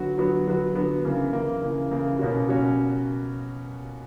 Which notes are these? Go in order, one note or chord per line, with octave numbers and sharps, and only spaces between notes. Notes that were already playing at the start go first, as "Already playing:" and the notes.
Already playing: D3 F#3 B3 F#4
D3 F#3 B3 F#4
D3 F#3 B3 F#4
D3 F#3 B3 F#4
C#3 E3 A#3
C#3 E3 A#3
C#3 E3 A#3
C#3 E3 A#3
B2 A#3 C#4 F#4
B2 A#3 C#4 F#4